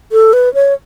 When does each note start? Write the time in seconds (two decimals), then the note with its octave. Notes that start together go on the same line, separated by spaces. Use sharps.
0.12 A4
0.33 B4
0.54 C#5